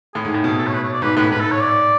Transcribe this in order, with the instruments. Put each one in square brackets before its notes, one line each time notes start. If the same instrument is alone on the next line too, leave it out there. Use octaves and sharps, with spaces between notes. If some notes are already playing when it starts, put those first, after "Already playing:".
[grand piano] A2 [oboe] G#4
[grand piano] G#2
A2
[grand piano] B2 [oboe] G#4
[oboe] A4
C#5
B4
C#5
D5
[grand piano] G#2 [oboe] B4
[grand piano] A2 [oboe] B4
[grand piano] G#2 [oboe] B4
[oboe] A4
C#5
D5